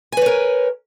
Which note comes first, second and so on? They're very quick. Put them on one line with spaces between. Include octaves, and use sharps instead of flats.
G#5 B4 C#5 A#4